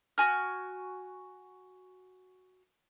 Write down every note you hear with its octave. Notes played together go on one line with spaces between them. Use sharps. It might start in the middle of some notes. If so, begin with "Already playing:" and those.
F#4 G#5 F6